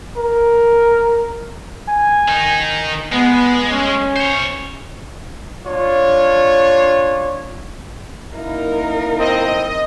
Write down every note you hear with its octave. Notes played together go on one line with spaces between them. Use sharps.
A#4
G#5
D#3 D#4
G#3 B3
C#4
C5 C#5
D4 F4 C#5
F#2 A#3 D#4 E4 A#4
C4 D#5